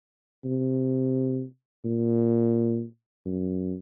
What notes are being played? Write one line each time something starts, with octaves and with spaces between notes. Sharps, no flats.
C3
A#2
F#2